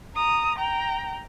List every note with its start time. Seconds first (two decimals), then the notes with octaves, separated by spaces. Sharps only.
0.15 A#5 D#6
0.58 G5 A#5